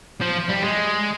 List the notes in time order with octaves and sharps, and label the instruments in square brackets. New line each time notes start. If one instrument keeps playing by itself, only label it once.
[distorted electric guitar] F3
G3
G#3